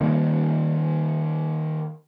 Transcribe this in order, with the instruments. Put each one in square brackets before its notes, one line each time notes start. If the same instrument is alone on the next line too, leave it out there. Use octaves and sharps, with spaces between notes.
[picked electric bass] D#3 G3 A#3